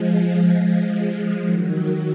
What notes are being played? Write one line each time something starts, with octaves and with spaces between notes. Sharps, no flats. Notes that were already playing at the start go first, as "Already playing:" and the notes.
Already playing: F3 G#3
F3 G#3
D#3 F#3